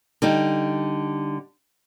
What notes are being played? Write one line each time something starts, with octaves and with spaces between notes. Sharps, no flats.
D3 G3 D#4